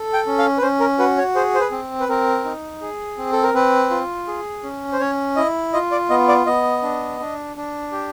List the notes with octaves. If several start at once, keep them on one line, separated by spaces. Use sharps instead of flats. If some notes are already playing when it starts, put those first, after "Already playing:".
Already playing: A4
G5
C#4
F5
B4
C#4 C5
A#4
F#4 B4
C#5
G#4 C5
C5
B4
C4
B4
C4 A#4
D#4
G#4
C4
A4
A#4
C4 B4
F4
G#4
C#4
C5
C#4 C#5
E4 D#5
F4 D#5
D5
B3 D#5
D5
B3 D#5
D4
D4
D4
G4